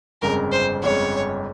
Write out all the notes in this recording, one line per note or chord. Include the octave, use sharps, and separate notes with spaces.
G1 F2 C#3 G#3 A#4
C5
G1 F2 C#3 G#3 C#5